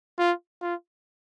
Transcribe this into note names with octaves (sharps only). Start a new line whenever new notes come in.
F4
F4